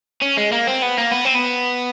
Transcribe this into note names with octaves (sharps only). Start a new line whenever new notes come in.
C#4
G#3
A#3
C4
B3
A#3
B3
C4
B3